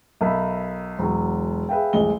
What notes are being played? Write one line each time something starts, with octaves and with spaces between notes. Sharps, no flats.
B1 A#4 E5 B5
E1 F#3
G#4 B4 E5 F5 G5
D#1 A1 G#3 G7